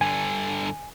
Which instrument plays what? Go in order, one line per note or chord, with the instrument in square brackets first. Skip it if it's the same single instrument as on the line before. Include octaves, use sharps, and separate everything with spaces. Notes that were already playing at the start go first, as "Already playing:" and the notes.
[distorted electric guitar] G2 D3 [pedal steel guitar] G#5